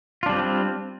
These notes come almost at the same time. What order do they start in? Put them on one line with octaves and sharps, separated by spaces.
F4 D4 G3 C4